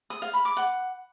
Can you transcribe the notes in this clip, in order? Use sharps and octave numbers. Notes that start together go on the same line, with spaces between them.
D#6
F5
B5
D6
F#5